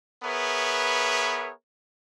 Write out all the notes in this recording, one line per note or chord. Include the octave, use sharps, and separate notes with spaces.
B3 G#4 A#4 B4 C#5 E5